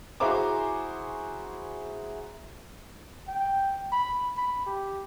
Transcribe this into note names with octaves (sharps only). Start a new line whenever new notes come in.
E4 F#4 G#4 C5 A#5 D6
G5
B5
B5
G4